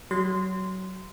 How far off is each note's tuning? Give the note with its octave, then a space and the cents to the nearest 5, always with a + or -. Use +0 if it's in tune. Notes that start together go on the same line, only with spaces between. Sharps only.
F#3 +25 C6 -15